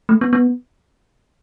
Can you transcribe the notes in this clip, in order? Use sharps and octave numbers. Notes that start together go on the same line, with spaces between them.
A3
B3
B3